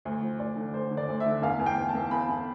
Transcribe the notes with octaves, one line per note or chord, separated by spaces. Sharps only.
D2
F3
D2 D5
D3
D2 C5
D3
D5
D2
E5
D3
E2 F5
E2
G5
E2
A5
E2
E2 B5
E2